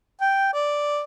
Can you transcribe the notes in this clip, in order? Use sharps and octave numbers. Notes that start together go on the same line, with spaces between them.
G5
D5